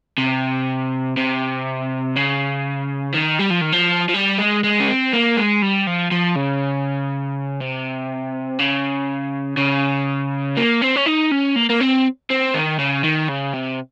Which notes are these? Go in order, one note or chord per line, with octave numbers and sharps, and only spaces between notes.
C3
C3
C#3
D#3
G3
F3
D#3
F3
F3
G3
G#3
G#3
C#4
C4
A#3
G#3
G3
F3
F3
C#3
C3
C#3
C#3
A#3
C4
C#4
D#4
C#4
A#3
A#3
C4
C4
D#3
C#3
D#3
C#3
C3